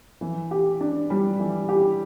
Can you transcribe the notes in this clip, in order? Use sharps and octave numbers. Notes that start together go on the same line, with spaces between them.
E3
G4
D4
G3
E3
G4